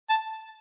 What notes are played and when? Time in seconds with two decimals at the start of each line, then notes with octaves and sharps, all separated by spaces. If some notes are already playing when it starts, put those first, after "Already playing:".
0.09 A5